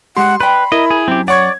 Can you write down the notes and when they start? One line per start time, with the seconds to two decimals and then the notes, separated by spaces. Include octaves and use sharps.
0.17 G#3 G4 F#5 C6
0.40 B4 D5 G5 B5
0.72 E4 A#4 D#5
0.91 G#4
1.08 F#2 C4 G4
1.28 C#5 D5 F#5 C#6 G#6